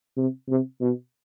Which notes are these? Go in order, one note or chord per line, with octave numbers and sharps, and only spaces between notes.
C3
C3
B2